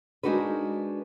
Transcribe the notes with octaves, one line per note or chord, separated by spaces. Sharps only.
G#3 D4 D#4 F#4 A#4 B4